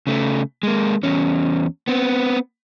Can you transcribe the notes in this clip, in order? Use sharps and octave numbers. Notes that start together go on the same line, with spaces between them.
C#3 A3
G#3 A#3
E2 C#4
B3 C4